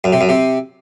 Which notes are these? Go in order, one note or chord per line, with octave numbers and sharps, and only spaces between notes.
F#2
C3
F#2
C3